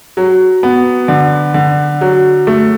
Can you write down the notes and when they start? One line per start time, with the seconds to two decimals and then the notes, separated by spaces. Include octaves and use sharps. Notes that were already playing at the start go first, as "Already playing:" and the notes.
0.17 F#3
0.63 B3
1.08 D3
1.54 D3
2.01 F#3
2.47 A3